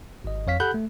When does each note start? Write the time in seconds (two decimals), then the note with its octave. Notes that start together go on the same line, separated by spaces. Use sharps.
0.24 G#1 D#5
0.47 F2 C#5 F5 B6
0.60 G4 A4 F#5 B5 F#6 G6
0.74 A3